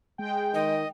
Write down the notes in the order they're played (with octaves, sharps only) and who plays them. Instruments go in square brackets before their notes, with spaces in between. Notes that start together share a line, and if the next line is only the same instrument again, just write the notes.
[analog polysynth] G#3 G5
[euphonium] D#3 [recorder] D#5